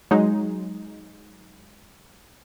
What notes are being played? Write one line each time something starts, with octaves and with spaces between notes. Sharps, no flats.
F#3 G#3 D#4